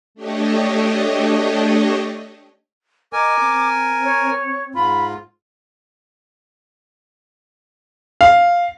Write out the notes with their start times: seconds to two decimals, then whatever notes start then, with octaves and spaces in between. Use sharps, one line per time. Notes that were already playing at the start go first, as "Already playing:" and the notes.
0.15 A3 D4 G4 C#5 D#5
3.13 A#4 D#5 G#5 D6
3.40 C4
4.04 C#5
4.75 G#2 F4 B5
8.21 F5